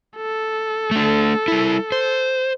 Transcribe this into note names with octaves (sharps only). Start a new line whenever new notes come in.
A4
A3 D4
G3 E4
C5